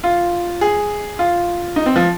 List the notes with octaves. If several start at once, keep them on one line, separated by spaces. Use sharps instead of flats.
F4
G#4
F4
D#4
C4
F3